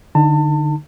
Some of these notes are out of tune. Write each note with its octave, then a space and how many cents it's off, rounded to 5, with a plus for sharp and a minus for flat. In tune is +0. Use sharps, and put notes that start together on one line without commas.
D3 +15 D#4 +0 A5 +30